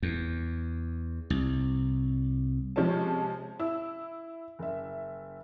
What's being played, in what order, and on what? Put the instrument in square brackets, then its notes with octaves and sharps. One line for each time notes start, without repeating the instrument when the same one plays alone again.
[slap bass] E2
C2
[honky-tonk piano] C3 F3 G#3 C#4 C#5 A5
E4 E6
F#1 E5